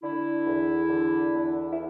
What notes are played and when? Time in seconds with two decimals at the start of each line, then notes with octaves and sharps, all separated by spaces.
0.02 D3 E4
0.46 E2
0.90 D3
1.34 E2
1.73 E4